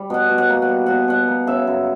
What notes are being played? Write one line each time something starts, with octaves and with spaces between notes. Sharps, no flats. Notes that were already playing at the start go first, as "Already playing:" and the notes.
Already playing: G3
B2 F#5
B2
F#5
A#3
F#5
G3
B2 F#5
B2 F#5
A#3
C#3 E5
F#2